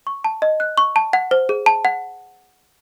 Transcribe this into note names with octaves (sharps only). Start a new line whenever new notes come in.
C#6
A5
D#5
F#6
C#6
A5
F#5
C5
G#4
A5
F#5